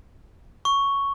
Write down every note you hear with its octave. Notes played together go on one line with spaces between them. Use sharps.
C#6